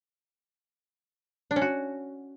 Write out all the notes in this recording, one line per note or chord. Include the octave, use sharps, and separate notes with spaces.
D4
C#4
F#4